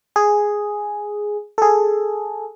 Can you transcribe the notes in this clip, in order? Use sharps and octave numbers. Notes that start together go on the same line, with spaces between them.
G#4
G#4 A4